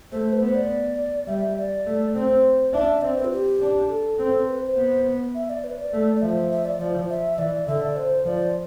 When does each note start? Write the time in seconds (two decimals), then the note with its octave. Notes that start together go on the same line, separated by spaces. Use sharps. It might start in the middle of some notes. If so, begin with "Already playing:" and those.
0.12 A3 C5
0.32 B4
0.40 B3 C5
0.54 D5
1.27 G3 E5
1.57 D5
1.86 A3
2.14 C4 C5
2.73 D4 E5
3.01 C4 D5
3.17 B4
3.24 F4
3.32 G4
3.60 D4
3.89 A4
4.19 C4
4.47 B4
4.61 C5
4.76 B3
5.35 E5
5.50 D5
5.64 B4
5.78 D5
5.93 A3
6.16 D5
6.22 F3 E5
6.51 E5
6.65 D5
6.79 F3 D5
7.09 E5
7.38 E3 D5
7.67 D3 E5
7.81 D5
7.96 C5
8.25 F3 D5